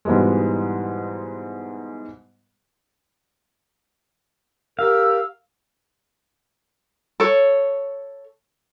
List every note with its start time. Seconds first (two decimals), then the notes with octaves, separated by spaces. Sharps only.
0.05 G#2 B2 E3 G3 G#3
4.79 G4 A#4 F5 E6
7.20 A4 C#5